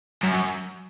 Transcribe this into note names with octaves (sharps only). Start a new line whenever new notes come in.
F#2